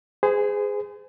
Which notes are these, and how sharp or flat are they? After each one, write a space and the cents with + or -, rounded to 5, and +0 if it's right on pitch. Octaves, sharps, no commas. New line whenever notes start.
G#4 -5 C5 -40